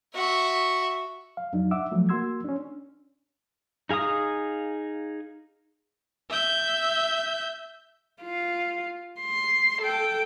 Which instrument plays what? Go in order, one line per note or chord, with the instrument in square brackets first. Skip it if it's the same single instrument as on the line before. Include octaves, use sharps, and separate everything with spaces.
[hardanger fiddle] F#4 E5
[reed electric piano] F5
F2 F#3 D4 D#4
E5 F#5 D6 E6
F3 F#3 A3
A#3 F#4 C6 E6 G#6
C#4 D4
[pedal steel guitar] D#4 G#4 F5 A#5 D#6
[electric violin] E5 G6
[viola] F4
C6
A4 G5